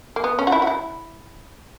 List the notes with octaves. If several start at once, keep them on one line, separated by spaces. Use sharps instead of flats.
A#3
B3
C#4
F#4
E4
F#4
E4